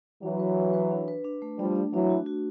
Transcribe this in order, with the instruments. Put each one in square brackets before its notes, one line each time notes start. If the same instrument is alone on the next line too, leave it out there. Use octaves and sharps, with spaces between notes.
[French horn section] E3 F#3 [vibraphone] D4
[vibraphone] B4
D4
B4
D4
B4
D4
A3
[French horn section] F3 G3 [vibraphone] D4
[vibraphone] D4
[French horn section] E3 F#3 [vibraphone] D4
[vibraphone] F#4
F#4